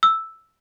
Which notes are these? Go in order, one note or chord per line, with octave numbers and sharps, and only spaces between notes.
E6